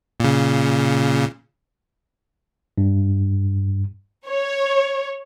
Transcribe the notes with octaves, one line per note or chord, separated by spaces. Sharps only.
A#2 C#3
G2
C#5